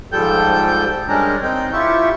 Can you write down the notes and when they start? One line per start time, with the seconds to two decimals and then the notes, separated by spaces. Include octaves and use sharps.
0.12 G#2 F3 G3 A4 G5 G6
1.08 G3 G#3 C#4 D4 A#4
1.43 C4 D#4 G5
1.73 E4 F4 G4 E5 C#6